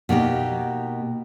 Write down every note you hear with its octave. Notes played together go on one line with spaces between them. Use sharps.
B2 A#3 D#4 G4